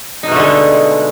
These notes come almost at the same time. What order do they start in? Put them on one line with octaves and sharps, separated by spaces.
D#4 B2 A3 D3 G#3